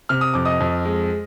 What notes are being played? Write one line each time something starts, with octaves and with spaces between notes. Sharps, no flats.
C3 F6
D#6
F2 D6
D#5 D#6
F2
G#3